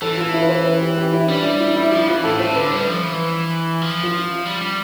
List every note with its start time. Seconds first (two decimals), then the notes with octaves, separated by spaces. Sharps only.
0.02 E3 A4
0.18 F4
0.34 E4
0.42 B4
0.49 C5
0.65 B4
0.81 G4
0.97 G4
1.13 E4
1.28 G3 D4
1.44 D4
1.60 E4
1.76 E4
1.92 F3 E4
2.08 E3 F4
2.24 A2 A4
2.39 A2 C5
2.55 D3 B4
2.72 G3
2.87 F3
3.03 E3
3.82 F3
4.03 F4
4.45 G3
4.62 G3